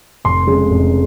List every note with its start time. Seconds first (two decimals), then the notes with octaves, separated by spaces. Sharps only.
0.25 F1 C6
0.47 F2 C#3 G#3
0.70 F1